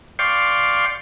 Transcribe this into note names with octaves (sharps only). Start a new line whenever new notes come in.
D5 F5 G5 C6 C#6